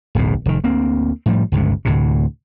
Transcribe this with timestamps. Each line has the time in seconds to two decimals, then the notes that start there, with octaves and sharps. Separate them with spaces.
0.15 D1 B1 E2 A2
0.46 F1 D#3
0.64 D2 A#3 C4
1.26 A2 F3 G3
1.52 G1 C#2 G2 C3
1.85 D2 A2 C3